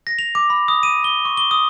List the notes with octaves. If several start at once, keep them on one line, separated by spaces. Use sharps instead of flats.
A#6
F7
D6
B5
D#6
D#7
G7
C#6
G7
D#6